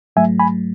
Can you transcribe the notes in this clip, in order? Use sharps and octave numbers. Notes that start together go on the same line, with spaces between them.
G#2 F#3 A3 E5 G#5
G#5 B5